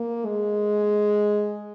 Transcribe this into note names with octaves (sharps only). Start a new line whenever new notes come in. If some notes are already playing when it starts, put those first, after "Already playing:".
Already playing: A#3
G#3